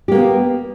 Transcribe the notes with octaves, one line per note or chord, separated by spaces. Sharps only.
A#3 B3 G4